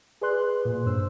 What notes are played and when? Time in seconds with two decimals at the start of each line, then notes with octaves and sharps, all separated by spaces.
0.21 G#4 B4 D5 C6 F#6
0.65 A#2
0.86 G2 C5 E6